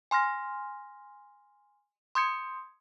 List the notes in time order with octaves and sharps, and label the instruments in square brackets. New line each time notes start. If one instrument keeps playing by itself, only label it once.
[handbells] G#5 C6 F6 A#6
C6 D#6 G6 G#6 C#7